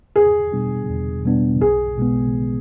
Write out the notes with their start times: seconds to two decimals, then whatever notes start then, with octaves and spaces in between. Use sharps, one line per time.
0.16 E2 G#4
0.52 B2 G3 B3 D4
0.89 E2
1.25 B2 G3 B3 D4
1.61 B1 G#4
1.98 B2 G#3 B3
2.34 B1